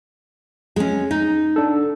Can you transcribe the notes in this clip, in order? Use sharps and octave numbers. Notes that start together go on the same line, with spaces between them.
G#3 C#4
D#4
D4 A4